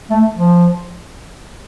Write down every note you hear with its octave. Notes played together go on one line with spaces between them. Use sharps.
A3
F3